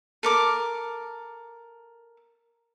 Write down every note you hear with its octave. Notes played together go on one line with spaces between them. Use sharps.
A4 A#4 D6